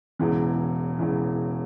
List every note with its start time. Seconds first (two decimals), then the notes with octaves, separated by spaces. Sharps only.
0.19 E1 E2 C#3 E3
0.99 E1 E2 C#3 E3